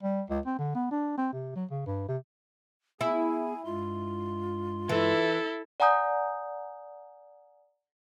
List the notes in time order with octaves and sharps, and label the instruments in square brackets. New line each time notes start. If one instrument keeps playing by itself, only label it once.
[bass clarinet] G3
C#2
C4
D3
B3
D4
C4
C3
F#3
C#3
G2
C3
[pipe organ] B3 G#4 [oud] E4 [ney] G#5
[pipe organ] G2 G#3 C6 [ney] F4
[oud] E3 [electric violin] E4 A4
[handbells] D5 F#5 G#5 A#5 D#6 G6